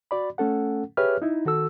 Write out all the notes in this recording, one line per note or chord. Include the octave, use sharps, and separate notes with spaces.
F#4 D5 B5
A3 C#4 A4 F#5
G4 G#4 B4 C#5 E5 F6
D#4 E4
D#3 F#4 A4 E6